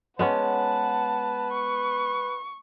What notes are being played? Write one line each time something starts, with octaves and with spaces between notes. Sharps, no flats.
G#3 B3 C#4 B4 F#5 A5
C#6